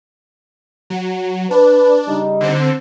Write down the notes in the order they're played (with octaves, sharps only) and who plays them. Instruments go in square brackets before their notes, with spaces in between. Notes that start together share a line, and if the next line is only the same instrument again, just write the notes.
[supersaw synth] F#3
[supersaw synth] D4 [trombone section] B4
[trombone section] C#3 G3 D#4
[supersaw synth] D3 C4